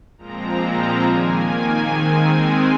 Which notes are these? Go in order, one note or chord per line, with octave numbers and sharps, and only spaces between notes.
A#2 F3 G#3 C4 A#5
A#5
D#3 A#3 G#5
D#3 G#3 C4